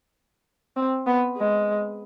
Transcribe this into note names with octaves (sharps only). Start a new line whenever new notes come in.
C4
B3
G#3